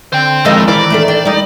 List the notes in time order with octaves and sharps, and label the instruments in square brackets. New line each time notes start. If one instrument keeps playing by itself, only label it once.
[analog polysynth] D3 [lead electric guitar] C5 G5
[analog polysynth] D#3 G#3 A#4 [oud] F3 C4 D#5 [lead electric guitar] E4 A4
[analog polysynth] D#3 E3 A#4 [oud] E4 C5 [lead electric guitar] D5
[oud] A3 D4 A4
[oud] D4 [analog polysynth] G5
[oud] G3 D#4